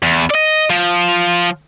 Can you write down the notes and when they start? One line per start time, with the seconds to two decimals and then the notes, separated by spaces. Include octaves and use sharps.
0.03 E2
0.30 D5 D#5
0.70 F3